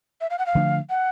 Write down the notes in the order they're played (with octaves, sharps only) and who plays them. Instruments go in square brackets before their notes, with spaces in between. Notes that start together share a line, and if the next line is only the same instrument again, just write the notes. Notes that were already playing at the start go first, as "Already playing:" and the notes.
[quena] E5
F5
F#5
F5
[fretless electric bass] D3 F3 A3 D4
[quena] F#5